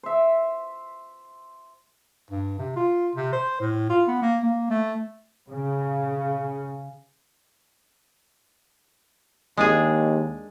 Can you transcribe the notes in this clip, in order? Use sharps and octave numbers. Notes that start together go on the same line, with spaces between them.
C5 E5
G2
C3
F4
C3
C5
A2
F4
B3
A#3
A#3
A3
C#3
D#2 G#3 D4 G#4